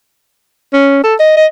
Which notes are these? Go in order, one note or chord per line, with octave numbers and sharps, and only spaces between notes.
C#4
A4
D#5
D#5